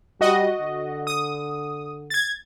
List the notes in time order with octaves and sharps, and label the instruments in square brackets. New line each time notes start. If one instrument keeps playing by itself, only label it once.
[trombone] G3 [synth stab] F#4 D#5
[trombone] D3
[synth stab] D#6
G#6 A6